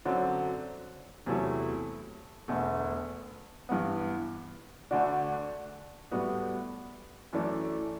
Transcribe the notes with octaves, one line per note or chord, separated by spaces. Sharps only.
F#2 D3 F#3 C4
E2 C3 F#3 A3 E4
E1 E2 D3 A3
G2 E3 B3
D2 D3 A3 D4 F#4
A2 G3 B3 F#4
F#2 E3 A3 D4